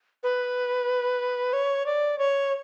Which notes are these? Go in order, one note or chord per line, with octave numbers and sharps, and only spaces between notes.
B4
C#5
D5
C#5